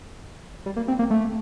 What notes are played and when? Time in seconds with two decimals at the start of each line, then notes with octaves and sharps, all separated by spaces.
0.66 G3
0.76 A#3
0.88 C4
0.99 A#3
1.10 A3